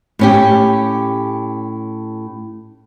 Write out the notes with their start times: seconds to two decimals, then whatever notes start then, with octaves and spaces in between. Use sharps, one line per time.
0.19 A2 C#4 G4